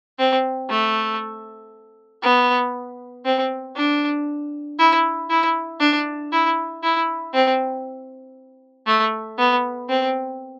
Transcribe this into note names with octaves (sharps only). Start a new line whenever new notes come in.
C4
A3
B3
C4
D4
E4
E4
D4
E4
E4
C4
A3
B3
C4